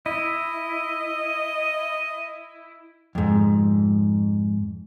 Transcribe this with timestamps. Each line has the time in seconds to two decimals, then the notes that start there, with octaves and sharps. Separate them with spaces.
0.06 E4 D#5
3.15 F2 G#2